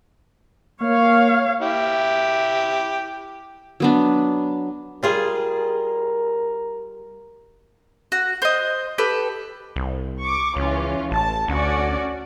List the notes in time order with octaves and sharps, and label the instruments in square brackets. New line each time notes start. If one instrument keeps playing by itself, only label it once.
[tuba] A#3 [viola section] C#5 F5
[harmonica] E4 G4
[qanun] F#3 B3 D4
[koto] G3 F4 G#4 [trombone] A#4
[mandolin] F#4
C5 D#5
G4 A4 B4
[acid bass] C2
[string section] C#6 D6
[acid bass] C#2 [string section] E3 C#4 F4
[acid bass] A1 [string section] A5
[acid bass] D2 [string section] C#4 F#4 D5